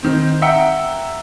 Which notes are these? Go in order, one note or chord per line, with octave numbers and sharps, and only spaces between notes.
D#3 C4
E5 F#5 G5 A#5 E6 C#7